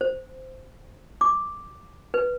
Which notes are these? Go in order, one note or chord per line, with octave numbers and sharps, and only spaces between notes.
C5
D6
B4